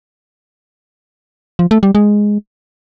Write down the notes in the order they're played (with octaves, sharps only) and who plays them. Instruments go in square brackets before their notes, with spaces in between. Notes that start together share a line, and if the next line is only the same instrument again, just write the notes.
[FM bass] F3
A3
G3
G#3